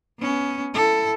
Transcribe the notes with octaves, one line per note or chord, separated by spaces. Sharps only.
B3 C#4
E4 A4